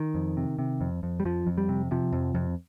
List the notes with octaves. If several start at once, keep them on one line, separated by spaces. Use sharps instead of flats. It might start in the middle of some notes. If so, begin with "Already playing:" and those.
Already playing: D#3
F2
C3
C3
F2
F2
G3
F2 F3
F2
G3
C3
C3 F3
F2
F2